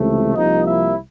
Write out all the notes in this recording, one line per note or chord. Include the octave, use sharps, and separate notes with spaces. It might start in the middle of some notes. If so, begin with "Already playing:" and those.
Already playing: C#2 C3 E3 A3
C2 C3 F3 A#3 D#4 D#5
E4 E5